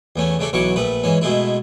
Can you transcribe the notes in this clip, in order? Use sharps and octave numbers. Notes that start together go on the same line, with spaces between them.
E2 A3 C#4
C#3 A3 D4 A4
B1 E3 F#3 C#6 D6
A#1 A3 B4
G#2 E3 C#4
B2 G#3 A3 E4